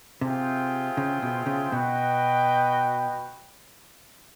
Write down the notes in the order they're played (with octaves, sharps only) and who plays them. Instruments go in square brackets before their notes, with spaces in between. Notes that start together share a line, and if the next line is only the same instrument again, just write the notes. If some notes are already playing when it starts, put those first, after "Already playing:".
[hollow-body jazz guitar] C3 [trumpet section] F4 G#4 C5 E5 G5
[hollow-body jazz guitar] C#3
B2
C#3
[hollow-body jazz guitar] B2 [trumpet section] F#4 B4 D#5 G5